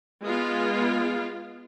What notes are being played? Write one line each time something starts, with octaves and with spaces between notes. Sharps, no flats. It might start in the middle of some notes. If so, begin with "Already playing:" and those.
G#3 B3 F4